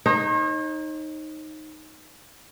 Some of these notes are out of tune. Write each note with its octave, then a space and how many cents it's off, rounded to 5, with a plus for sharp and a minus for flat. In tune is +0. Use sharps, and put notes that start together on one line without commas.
D#4 +0 C#5 -45